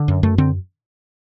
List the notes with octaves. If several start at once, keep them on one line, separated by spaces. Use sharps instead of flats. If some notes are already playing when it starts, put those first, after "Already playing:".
Already playing: D3
F#2
F#2 A3
D3 C4